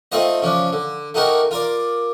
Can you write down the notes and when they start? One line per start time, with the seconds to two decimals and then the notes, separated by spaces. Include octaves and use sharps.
0.12 A3 C4 D#4 F4 C5 D#5
0.42 C#3 F3 D4
0.73 D3
1.14 A3 D#4 F#4 G4 A#4
1.51 F4 A#4 D5